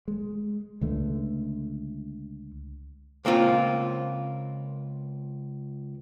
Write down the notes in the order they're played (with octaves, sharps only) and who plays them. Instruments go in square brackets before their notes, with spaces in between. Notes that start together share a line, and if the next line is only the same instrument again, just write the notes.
[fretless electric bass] G#3
C#2 D3 A3
[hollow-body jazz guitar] C#2 A#3 C4 F4